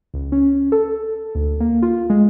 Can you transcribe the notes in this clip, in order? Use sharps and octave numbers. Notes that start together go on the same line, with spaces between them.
C#2
C#4
A4
D2
A#3
F4
G#3